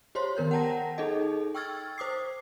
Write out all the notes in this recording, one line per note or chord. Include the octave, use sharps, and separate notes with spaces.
G4 C5 C#5 C6
D#3 B3 A#4 G6
F#5 G5 A5 A#5 A#6
D#4 G#4 A4 D#5
G5 C#6 E6 F6 G#6 A6
C5 D6 D#6 C7